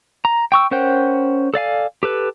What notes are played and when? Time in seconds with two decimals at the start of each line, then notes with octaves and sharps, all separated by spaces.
0.25 A#5
0.52 G5 C#6 E6
0.71 C#4 A#4 C5 F#5 G5
1.54 A4 D5 F5 G#5
2.03 G4 A4 B4